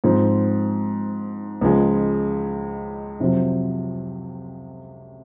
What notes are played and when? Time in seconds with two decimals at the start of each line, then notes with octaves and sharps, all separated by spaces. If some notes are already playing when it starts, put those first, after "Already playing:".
0.04 G#2 F3 C4
1.61 C#2 C#3 F3 G#3
3.20 F2 C3 F#3 C4 F4